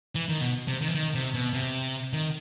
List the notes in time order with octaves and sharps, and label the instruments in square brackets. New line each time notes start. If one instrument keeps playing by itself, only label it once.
[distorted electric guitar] E3
D#3
B2
C3
D#3
E3
D#3
C3
B2
C3
D#3